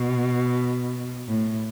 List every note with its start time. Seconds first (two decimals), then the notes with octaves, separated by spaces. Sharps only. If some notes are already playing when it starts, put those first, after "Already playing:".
Already playing: B2
1.28 A2